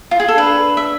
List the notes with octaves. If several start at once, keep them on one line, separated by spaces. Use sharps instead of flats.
F4
G#4
A4
D4 B4
E5